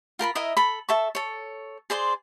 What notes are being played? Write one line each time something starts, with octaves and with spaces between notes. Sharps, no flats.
F4 A#4 A5 B5
E4 A#4 D#5 E5
A4 B5
A4 E5 A5 C#6
A4 C#5
G#4 C5 D5 C6